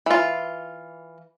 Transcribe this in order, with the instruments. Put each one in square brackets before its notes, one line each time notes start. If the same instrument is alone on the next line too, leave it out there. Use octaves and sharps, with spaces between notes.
[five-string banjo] E3 F4